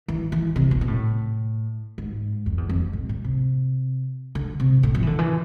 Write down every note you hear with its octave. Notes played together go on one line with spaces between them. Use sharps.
E3
E3
C3
B2
B2
A2
G#2
F2
E2
F2
A2
A2
C3
D3
C3
A2
F3
E3
D3
E3